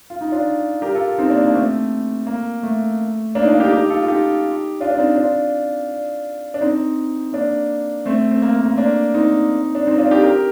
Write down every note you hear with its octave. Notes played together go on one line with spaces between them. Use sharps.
F4
D#4
D4 F4
G4 A#4
F4 A4
C4 D#4
A#3 D4
A#3 D4
A3 C4
A#3
A3
A#3 D4
D#4
D4 F4
D#4 G4
D#4 G4
F4 A4
F4
D#4 G4
D4 F4
D4
C4 D#4
D4 F4
D4
C4 D#4
A#3 D4
A3 C4
C4
A#3
A#3
A#3
A#3 D4
C4 D#4
D4
C4 D#4
D4 F4
D#4 G4
G4 A#4